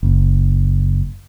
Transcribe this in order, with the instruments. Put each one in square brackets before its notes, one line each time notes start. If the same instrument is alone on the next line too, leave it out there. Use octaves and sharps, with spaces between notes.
[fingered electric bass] F#1